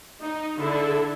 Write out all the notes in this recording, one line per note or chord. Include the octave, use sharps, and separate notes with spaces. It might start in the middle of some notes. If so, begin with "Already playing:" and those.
D#4
D3 E4 A4